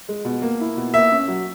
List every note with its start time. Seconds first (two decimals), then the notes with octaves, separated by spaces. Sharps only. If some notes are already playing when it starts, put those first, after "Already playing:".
0.09 G#3
0.25 B2
0.42 A#3
0.60 E4
0.77 B2
0.94 A#3 E5
1.12 C#4
1.28 F#3